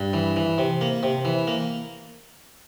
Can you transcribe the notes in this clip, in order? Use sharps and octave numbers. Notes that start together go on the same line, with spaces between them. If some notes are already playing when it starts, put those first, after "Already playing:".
Already playing: G2
E3
E3
C3
A#3
C3
E3
A#3